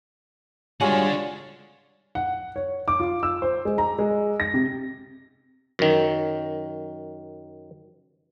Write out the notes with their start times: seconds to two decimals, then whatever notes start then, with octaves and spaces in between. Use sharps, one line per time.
0.81 G3 G#3 D4 F4 F#4 C#5 F#5 G#5
2.15 F#5
2.56 C#5
2.88 D6
3.00 F4
3.23 E6
3.42 C5
3.65 G#3
3.78 A#5
3.99 G#3
4.40 A#6
4.54 C3
5.79 F#2 D#3